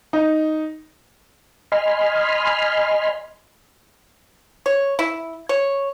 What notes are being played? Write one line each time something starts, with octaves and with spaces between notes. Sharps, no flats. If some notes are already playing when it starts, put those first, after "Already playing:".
D#4
D#5 G#5 B5 C6 F6
C#5
E4
C#5